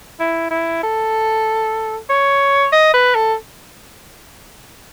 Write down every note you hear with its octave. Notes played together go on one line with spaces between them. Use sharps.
E4
E4
A4
C#5
D#5
B4
A4